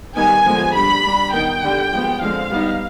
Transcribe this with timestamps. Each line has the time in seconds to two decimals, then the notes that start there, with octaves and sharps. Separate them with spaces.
0.15 D#3 G3 B3 D#4 G#5
0.45 D3 F3 G#3 B3
0.74 G3 D4 B5
1.03 G3 D4
1.33 D#3 B3 D#4 G5
1.63 D3 G3 D4
1.91 F3 G#3 B3
2.22 D3 F3 G#3 C4 F5
2.51 G3 B3 D#4